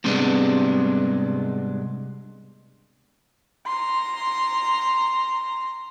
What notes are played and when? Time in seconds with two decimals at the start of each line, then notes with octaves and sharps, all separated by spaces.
0.04 G#2 C3 G3 G#3 B3 D4
3.66 A#5 C6